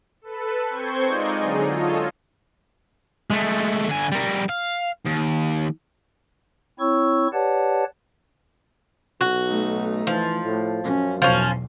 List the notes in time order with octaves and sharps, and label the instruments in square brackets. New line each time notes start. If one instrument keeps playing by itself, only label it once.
[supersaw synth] A4 B4
C4 C5 C#6 G6 G#6
G#3 D#4 F4 D5 D#5
D3 F#3 D#4 G#4
F4 A4 C#5 D#5
[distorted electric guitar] G#3 A3
D3 G#5
G3 A#4
F5
D#2
[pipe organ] C4 E4 C#5 C#6 E6
G4 B4 C#5 D5 F#5 A5
[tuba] B1 [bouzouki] F#4
[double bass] A3 D#4
[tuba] E3 [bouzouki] F3
[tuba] A2
[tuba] F#2 [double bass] C#4
[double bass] B1 E2 [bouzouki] F3 C#4